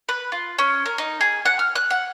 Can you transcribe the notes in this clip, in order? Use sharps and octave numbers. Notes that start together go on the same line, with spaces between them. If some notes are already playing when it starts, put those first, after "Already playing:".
B4
F4
C#4
A#4
D#4
G#4
F#5
F6
F#6
F#5